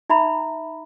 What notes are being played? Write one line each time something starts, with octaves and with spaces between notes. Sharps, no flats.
D#4 E5 A#5 B5